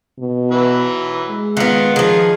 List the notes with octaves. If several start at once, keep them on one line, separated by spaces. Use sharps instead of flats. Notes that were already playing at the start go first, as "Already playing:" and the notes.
B2
E3 F#3 B4
G#3
D#3 B3 F4 F#5
D#3 F3 G#4